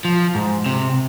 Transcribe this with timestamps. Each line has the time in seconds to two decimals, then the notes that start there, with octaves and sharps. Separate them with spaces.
0.05 F3
0.35 G#2
0.66 C3